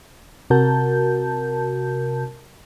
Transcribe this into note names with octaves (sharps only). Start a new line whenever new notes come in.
C3 F#4 A#4 A5 G6